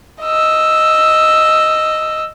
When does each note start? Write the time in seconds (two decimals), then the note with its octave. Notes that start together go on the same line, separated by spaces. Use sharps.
0.22 D#5 E6